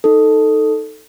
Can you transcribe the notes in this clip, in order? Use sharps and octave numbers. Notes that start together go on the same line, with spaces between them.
D#4 A4